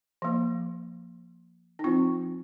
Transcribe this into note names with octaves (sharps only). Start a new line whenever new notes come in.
F3 A#3
D#4
F3 C4 F4